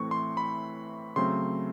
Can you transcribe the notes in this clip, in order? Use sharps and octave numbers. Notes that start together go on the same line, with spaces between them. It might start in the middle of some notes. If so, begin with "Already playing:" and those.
Already playing: A2 E3 A3 C4 C#6
C6
B5
C#3 F#3 A3 C4 C6